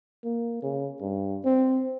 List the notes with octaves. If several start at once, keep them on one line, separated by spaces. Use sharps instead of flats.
A#3
C#3
G2
C4